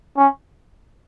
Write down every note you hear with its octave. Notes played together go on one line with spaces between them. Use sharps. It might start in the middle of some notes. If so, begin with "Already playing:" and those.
C#4